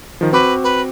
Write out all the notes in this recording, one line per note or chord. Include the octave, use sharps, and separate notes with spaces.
D#3 F3
C4 F#4 B4 D6
B4